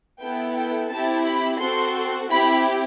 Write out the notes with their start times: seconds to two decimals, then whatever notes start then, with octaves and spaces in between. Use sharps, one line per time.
0.20 B3 E4 A4 G5
0.55 G5
0.90 C4 E4 G4 A5
1.25 B5
1.59 C4 F#4 A4 C6
2.29 C4 E4 G4 B5